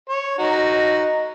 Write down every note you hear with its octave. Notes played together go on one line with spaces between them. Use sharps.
C#5
D#4 F#4